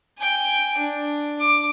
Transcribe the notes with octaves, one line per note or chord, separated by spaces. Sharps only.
G5 G#5
D4
D6